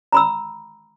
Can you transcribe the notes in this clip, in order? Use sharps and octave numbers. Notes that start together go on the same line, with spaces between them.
A#5 B5 E6